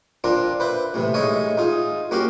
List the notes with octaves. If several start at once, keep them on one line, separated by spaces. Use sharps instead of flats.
C4 D4 F4 A#4
B4 C5 E5
A2 C3 E3
A2 G#3 D#4 C#5 E5 G#5
D#4 F4 G#4
A#3 C#4 F#4 G4 F5